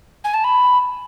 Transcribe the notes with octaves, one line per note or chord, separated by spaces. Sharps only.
G#5
A5
B5